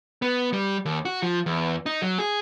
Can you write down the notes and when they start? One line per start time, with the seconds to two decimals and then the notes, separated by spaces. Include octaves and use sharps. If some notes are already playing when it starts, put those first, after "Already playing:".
0.22 B3
0.53 G3
0.85 D#2
1.05 F#4
1.22 F3
1.46 E2
1.86 D#4
2.02 F#3
2.19 G#4